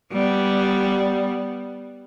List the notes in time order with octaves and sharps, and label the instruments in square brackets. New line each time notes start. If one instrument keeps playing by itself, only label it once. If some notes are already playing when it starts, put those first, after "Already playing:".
[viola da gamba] G3 B3